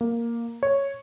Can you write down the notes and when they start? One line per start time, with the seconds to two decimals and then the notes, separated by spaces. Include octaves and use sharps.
0.01 A#3
0.63 C#5